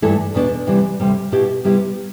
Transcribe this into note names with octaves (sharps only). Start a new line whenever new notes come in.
G2 E3 A3 E4 A4
E2 B2 B3 D4
C3 E3 G3 D4
D2 C3 G3 C4
B2 B3 E4 G4
C3 G3 B3 E4 G4